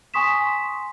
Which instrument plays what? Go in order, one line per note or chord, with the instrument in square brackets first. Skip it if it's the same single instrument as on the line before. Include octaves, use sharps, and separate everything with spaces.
[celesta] G#5 C6 C#6 D#6 B6 E7